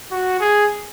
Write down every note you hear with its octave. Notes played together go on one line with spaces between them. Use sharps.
F#4
G#4